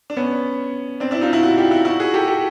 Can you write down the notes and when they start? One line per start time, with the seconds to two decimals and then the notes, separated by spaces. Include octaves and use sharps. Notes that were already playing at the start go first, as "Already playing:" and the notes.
0.10 D4
0.17 B3 C#4
1.00 C4 D4
1.11 D4 E4
1.21 D#4 F4
1.33 E4 F#4
1.43 E4 F#4
1.57 F4 G4
1.71 E4 F#4
1.85 E4 F#4
2.00 F#4 G#4
2.14 G4 A4
2.27 G4 A4